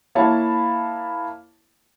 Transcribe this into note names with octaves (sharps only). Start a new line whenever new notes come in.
A#3 E4 C#5 A5